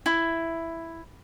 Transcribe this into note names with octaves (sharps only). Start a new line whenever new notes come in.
E4